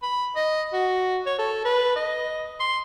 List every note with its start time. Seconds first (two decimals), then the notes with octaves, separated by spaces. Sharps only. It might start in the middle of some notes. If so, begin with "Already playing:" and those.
0.02 B5
0.36 D#5
0.73 F#4
1.26 C#5
1.39 A4
1.65 B4
1.96 D#5
2.60 C6